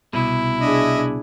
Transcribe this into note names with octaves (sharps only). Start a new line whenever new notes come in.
C2 B2 E4
D4 G#4 D#5 E5